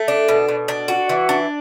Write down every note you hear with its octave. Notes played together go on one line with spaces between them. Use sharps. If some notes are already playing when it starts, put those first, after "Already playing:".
Already playing: A3
D4
B2
B2
D4
F#4
E3
D4